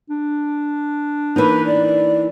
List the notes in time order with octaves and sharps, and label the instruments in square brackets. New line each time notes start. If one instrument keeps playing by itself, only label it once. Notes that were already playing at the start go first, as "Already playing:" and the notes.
[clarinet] D4
[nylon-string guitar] E3 A#3 D#4 [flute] B4
[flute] D5